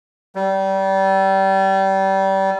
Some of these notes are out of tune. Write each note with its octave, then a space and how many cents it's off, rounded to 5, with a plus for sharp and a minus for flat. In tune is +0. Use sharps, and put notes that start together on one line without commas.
G3 -25